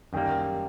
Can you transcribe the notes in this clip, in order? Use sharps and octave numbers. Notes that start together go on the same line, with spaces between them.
F#2 D#3 G3 A#3 G5